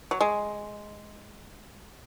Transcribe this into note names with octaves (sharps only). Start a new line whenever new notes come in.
F#3
G#3